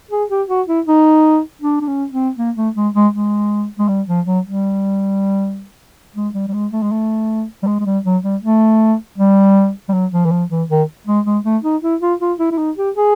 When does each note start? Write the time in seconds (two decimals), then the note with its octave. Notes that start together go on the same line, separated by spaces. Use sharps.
0.11 G#4
0.30 G4
0.49 F#4
0.67 E4
0.87 D#4
1.62 D4
1.81 D4
1.87 C#4
2.12 C4
2.38 A#3
2.56 A3
2.76 G#3
2.95 G#3
3.13 G#3
3.79 G#3
3.89 G3
4.08 F3
4.27 F#3
4.46 G3
6.16 G#3
6.34 G3
6.48 G3
6.54 G#3
6.72 A3
6.82 G#3
6.92 A3
7.63 G3
7.67 G#3
7.80 G#3
7.86 G3
8.05 F#3
8.23 G3
8.42 A3
9.18 G3
9.89 G3
9.93 F#3
10.12 F3
10.26 E3
10.31 F3
10.50 E3
10.70 D#3
11.07 G#3
11.25 G#3
11.44 A3
11.64 D#4
11.82 E4
12.01 F4
12.20 F4
12.39 E4
12.51 E4
12.58 D#4
12.77 G4
12.96 G#4